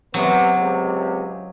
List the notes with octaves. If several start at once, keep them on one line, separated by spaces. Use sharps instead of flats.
C3 F#3 B3
C#2 C3